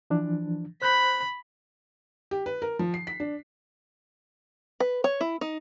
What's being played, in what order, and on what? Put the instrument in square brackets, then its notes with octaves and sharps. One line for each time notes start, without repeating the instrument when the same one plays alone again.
[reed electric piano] E3 F3 D4
[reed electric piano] C5 F#6 G6 [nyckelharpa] B5
[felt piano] G4
B4
A#4
F3
C7
B6
D4
[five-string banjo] B4
C#5
E4
D#4